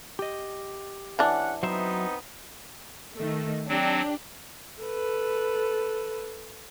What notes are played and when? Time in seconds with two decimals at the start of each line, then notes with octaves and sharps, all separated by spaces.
0.19 G4 D#5
1.19 E3 C#4 D4 F#5
1.63 F#3 B3 C4 D#4 C5 E5
3.15 D#3 A3
3.69 F#3 C4 D4 G4
4.83 A4 B4